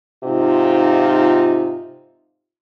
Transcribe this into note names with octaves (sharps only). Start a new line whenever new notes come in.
G#2 C3 D#4 F4